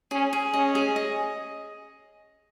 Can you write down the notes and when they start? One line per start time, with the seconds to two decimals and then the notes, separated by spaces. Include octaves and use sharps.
0.11 C#4 G#4
0.33 G#4
0.54 C#4 D#5
0.75 G#4
0.96 D#5